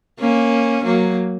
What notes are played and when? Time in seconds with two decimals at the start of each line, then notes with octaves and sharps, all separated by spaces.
0.20 A#3 C#4
0.84 F#3 A#3